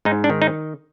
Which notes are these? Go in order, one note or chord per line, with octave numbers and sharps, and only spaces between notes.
G#2 D#4
D4
D#3
D#4